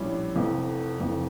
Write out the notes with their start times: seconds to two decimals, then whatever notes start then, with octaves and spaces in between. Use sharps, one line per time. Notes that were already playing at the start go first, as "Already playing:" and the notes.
Already playing: A#1 A2 G3 C#4 E4
0.34 F1 F2 E3
0.98 F1 F2 E3